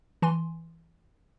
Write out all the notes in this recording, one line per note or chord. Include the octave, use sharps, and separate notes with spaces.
E3 G#5 C6